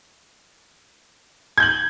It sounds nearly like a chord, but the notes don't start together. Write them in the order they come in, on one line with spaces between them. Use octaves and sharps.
G#6 G6 F#7